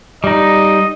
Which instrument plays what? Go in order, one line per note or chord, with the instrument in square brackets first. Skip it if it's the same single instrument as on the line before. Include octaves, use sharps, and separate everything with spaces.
[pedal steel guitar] G3 D#4 [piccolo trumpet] D#5